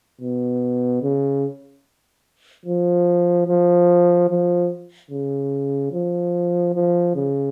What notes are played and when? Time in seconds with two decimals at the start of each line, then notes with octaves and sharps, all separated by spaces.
0.21 B2
1.03 C#3
2.66 F3
3.47 F3
4.29 F3
5.11 C#3
5.92 F3
6.74 F3
7.15 C#3